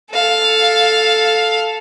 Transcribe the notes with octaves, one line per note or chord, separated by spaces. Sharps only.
A4 F5